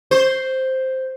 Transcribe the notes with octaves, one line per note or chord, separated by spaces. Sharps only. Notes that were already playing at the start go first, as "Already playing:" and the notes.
C5